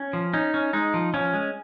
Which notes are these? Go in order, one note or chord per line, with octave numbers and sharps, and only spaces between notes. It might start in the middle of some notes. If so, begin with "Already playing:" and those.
Already playing: C#4
F3
C#4 D#4
C#4
G#3 D#4
F3
F3 C#4
G#3